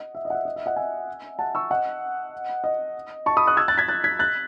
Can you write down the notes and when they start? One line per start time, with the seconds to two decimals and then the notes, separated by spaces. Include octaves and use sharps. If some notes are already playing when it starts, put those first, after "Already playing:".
Already playing: D#5 F#5
0.15 E5
0.25 D#5
0.30 F#5
0.35 E5
0.45 D#5
0.56 E5
0.66 D#5 F#5
0.76 E5 G#5
1.39 F#5 A5
1.55 C#6 E6
1.71 D#5 F#5
2.64 D#5
3.26 A5 C#6
3.37 B5 D#6
3.47 D#6 F#6
3.57 E6 G#6
3.68 F#6 A6
3.78 G#6 B6
3.88 F#6 A6
4.04 G#6 B6
4.19 F#6 A6